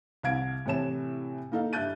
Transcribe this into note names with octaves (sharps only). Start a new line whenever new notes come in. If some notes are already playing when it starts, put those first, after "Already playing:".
C2 F5 G#6 D7
A2 C3 E3 C#5 A5 E7
A#3 D#4 A4 F5
G2 E5 F#6 G6 A6 D#7